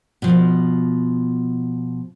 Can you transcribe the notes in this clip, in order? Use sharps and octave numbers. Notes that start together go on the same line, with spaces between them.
B2 F3